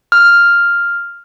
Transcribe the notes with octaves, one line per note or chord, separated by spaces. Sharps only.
F6